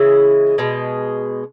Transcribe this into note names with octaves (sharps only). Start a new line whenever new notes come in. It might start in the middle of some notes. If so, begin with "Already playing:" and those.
Already playing: C#3 E3 G#3 E4
B2 G#3